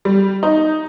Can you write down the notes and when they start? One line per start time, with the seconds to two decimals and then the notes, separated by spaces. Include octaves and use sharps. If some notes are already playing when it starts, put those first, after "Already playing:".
0.05 G3
0.43 D#4